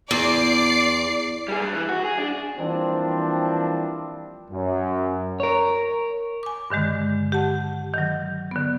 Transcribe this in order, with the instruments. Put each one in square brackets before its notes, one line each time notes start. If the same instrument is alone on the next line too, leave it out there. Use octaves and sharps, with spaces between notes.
[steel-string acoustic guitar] E2 [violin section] D5 D6 C7
[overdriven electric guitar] G3 G#4
G2
E3
F#4
G#4
D4
[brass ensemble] E3 F3 G3 A#3 C4 D4
F#2
[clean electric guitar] A#4 C#5
[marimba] G#5 D6
G2 D3 D#3 G#3
G4 F#5 A5
D#3 F#3
D3 B3